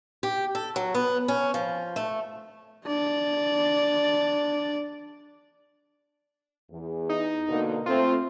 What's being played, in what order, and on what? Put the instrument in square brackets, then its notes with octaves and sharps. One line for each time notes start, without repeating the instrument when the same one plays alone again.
[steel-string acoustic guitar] G4
A4
F#3
B3
C#4
F3
A3
[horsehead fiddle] D4 D5
[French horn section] E2
[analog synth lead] D#4
[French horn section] B2 D3 A#3
[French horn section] A3 C4 [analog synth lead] F4